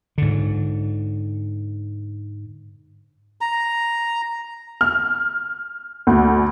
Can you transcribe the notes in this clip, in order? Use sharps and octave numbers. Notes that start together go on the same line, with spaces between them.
G#2 D3
A#5
F6
D2